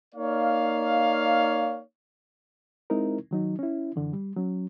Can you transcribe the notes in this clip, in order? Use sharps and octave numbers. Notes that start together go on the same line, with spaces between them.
A#3 D#4 C#5 D5 F5
G#3 C4 D#4 E4 A#4
D#3 F#3 D#4
C#4 E4
F#2 D3 E3
G3
F#3 C#4